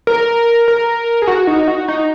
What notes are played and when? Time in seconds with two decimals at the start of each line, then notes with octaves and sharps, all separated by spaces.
0.07 A#4
0.68 A#4
1.22 G#4
1.27 F#4
1.47 D#4
1.68 F#4
1.88 D#4